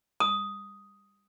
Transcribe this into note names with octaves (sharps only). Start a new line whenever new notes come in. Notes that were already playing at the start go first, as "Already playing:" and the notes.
D#6